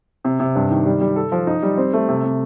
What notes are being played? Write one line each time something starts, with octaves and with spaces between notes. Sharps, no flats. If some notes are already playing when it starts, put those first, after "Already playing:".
C3
C3
G2
D#3
G3
G3
A4
F3
D#4
G3
C4
A3
C3
C3